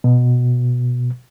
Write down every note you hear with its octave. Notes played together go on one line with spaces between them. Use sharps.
B2